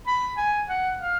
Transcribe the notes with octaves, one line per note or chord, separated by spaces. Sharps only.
B5
G#5
F#5
F5